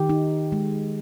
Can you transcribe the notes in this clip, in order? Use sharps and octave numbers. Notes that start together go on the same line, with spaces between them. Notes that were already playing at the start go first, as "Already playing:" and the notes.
Already playing: D#3 G4
D#4
G#3